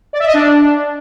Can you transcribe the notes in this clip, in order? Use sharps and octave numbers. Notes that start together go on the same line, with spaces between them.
D5
E5
D#5
D4